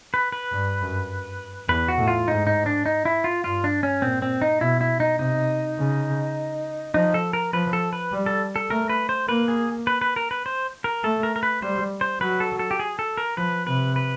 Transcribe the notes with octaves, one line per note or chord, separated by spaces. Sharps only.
B4
B4
G2
F#2
E2 B4
F#4
A2
F4
G#2 D#4
D#4
D4
D#4
E4
F4
G2 F4
D4
C#4
A#2 C4
C4
D#4
B2 E4
E4
D#4
C3 D#4
C#3
F3 D#4
A4
A#4
F3 B4
A4
B4
G3
A4
A4
A3 A#4
B4
C5
A#3 B4
G#4
B4
B4
A#4
B4
C5
A#4
A3 A4
A#4
A#4
B4
G3 C5
C5
F#3 B4
A4
A4
G4
G#4
A4
A#4
F3 B4
C3 B4
B4